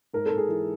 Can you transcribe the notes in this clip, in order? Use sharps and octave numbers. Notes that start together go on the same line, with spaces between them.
G#2 A#4
A4
G#2
G#4
E3